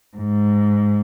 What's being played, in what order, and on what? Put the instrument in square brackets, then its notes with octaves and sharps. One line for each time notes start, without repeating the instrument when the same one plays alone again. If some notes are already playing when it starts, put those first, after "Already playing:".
[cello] G#2